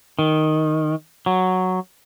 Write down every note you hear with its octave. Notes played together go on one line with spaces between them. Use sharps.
D#3
F#3